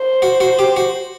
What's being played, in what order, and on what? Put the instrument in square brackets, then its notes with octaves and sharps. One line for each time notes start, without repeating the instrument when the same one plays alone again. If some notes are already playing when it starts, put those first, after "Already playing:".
Already playing: [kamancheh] C5
[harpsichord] F#4
F#4
G4
F#4